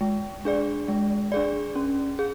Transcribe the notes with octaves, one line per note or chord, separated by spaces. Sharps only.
G#3
D4 G#4 D5
G#3
D4 G#4 D5
C#4
G#4